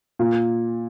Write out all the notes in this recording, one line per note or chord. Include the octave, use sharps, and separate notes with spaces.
A#2